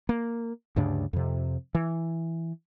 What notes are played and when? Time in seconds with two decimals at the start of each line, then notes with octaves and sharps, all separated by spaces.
0.09 A#3
0.76 D2 G2 C#3 D4
1.13 F2 C3
1.75 E3